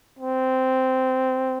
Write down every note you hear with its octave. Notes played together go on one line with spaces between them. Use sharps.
C4